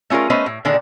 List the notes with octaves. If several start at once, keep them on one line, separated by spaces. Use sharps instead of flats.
A3 C#4 F4 G#4 A#4
A3 B3 C#4 B4 C5 D#5
A2
A#2 D3 D#3 D4 G#4